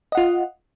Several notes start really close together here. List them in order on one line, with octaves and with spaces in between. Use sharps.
D#5 F#5 F4